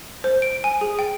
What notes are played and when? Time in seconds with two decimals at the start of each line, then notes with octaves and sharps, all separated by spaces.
0.24 C5
0.42 D7
0.64 G#5
0.81 G#4
0.99 G5